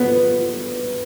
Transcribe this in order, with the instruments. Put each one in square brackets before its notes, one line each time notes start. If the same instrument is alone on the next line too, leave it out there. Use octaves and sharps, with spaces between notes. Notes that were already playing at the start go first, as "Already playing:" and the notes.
Already playing: [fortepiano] B3